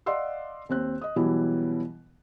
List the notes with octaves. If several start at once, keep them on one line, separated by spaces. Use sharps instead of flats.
D5 D#5 F5 F#5 C6 E6
D#2 C4 F#6
D#5 D#6
B2 E3 F#3 G3 B3 E4